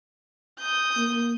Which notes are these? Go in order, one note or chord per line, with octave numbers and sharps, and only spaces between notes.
D#6 G6
A#3